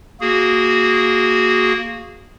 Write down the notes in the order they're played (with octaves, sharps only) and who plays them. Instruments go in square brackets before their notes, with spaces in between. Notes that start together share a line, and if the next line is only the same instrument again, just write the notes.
[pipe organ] A#3 F#4 G#4